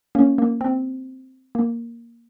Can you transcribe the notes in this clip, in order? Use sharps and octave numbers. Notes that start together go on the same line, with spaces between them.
A#3 C#4
A#3
C4
A#3